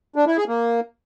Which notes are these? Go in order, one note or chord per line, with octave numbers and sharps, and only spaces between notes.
D4
E4
G#4
A#3